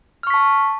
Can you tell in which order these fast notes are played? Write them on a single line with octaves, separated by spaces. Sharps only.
F6 C#6 B6 A5